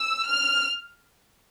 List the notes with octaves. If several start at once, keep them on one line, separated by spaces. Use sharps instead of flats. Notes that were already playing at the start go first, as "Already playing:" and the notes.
Already playing: E6
F6